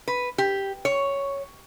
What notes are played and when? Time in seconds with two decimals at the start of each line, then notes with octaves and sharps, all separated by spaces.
0.08 B4
0.38 G4
0.85 C#5